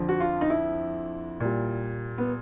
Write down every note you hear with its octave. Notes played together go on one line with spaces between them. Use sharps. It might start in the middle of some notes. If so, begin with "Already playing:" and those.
Already playing: F2 D3 F3
F#4
F4
D#4
E4
A#2 G3
B3